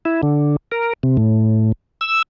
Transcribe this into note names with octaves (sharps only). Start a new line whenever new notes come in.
E4
D3
A#4
C3
A2
E6